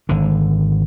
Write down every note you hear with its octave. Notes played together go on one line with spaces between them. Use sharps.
G#1 D3